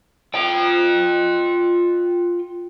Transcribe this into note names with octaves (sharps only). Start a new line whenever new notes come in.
F4 G5